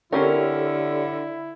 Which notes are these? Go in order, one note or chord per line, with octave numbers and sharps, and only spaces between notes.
D3 C4 C#4 E4 G4 A4 A#4 C#5